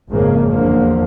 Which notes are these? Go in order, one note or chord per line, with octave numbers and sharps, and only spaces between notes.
G#1 F2 C#3 A#3
E2 D3 F3 A#3